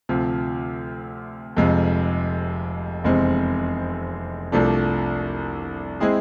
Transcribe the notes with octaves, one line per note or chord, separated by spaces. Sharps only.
D2 C3 F3
F1 F2 C3 G#3
F1 E2 C3 G#3 C4
C2 C3 F3 A3 D4
G#3 C4 E4 G#4